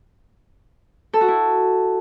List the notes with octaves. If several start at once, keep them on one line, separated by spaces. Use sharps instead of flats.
A4
F#4
E4